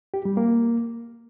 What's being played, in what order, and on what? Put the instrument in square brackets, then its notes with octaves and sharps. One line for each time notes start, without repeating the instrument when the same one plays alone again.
[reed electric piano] G4
G3
A#3